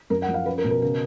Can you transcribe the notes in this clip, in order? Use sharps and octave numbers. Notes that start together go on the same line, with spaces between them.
F#2 A#4
F#5
F3
F5
C#4 B4
A#4
B2
A#4
C#3 A#4